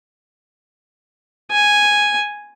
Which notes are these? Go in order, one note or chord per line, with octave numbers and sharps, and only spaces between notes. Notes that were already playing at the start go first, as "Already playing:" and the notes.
G#5